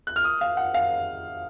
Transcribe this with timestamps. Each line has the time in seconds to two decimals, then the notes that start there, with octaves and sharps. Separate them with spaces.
0.07 F#6
0.16 F6
0.24 D#6
0.41 F5
0.57 F#5
0.74 F5